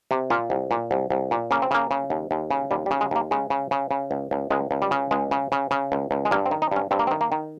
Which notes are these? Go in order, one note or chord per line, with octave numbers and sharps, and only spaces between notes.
C3
A#2 F4
C2
A#2
C2
C2
A#2
C#3 A#3
C4
C#3 A#3
C#3
D#2
D#2
C#3
D#2 G3
G3
C#3
G#3
D#2 A#3
C#3 G#3
C#3
C#3
C#3
C#2
C#2
C#2 G#3
C#2
G3
C#3
C#2 G#3
C#3
C#3
C#3
C#2
C#2
G#3
G2 A#3
C4
D#3
D#4
G2 C#4
G2 C4
A#3
C4
D#3
A#3
D#3